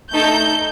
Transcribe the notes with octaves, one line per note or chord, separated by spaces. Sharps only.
A3 D#4 A4 G6